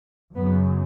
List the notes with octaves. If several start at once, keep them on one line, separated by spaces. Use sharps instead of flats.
F#2 C#3 B3